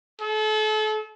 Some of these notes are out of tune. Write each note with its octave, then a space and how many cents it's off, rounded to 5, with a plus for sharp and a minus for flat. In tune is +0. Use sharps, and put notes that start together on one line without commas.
A4 -35